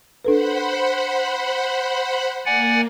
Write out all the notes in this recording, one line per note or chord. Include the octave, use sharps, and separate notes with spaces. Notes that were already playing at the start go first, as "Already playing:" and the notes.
D4 A4 B4 C5 F#5 B5
A#3 D5 F#5 G#5